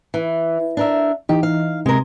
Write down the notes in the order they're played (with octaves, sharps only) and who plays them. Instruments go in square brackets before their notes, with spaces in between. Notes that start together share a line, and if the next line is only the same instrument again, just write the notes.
[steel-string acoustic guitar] E3
D4 A#4 E5
[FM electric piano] E3 D#4 [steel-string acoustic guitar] G4
[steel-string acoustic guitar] F5
[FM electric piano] C3 [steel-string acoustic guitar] G#3 A#4